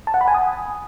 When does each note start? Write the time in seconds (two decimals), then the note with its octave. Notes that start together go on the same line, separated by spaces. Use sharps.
0.07 A5
0.14 F#5
0.21 B5
0.28 G#5
0.34 D#6